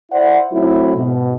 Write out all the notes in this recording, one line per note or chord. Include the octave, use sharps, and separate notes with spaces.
E4 C5 D5 F#5
F#3 A3 C4 E4
G#2 B2